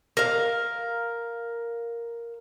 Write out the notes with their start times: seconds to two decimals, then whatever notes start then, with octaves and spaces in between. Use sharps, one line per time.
0.17 A#4 F5